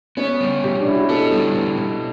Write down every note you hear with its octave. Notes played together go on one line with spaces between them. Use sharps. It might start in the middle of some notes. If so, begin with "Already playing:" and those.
B3 C#4
G3
B2 G4
D4
B2 E4
F#4
G4
B3 A4
G3
B2
B2